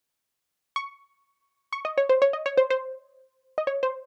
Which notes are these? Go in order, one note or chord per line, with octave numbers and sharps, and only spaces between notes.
C#6
C#6
D#5
C#5
C5
C#5
D#5
C#5
C5
C5
D#5
C#5
C5